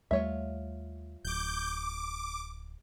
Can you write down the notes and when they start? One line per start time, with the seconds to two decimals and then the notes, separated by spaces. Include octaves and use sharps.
0.11 D#2 G3 A3 F4 C#5 E5
1.25 D1 D6 G6
1.67 D6